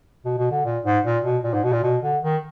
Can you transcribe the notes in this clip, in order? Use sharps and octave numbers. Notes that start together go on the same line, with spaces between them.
B2
B2
D3
A#2
G#2
A#2
B2
A#2
G#2
B2
A#2
B2
D3
D#3